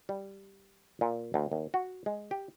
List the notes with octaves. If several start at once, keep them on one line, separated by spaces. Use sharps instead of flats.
G3
A#2
D2
D#2
F#4
G#3
G4